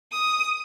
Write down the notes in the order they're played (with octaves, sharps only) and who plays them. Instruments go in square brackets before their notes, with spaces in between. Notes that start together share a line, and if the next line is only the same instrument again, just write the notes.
[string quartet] D#6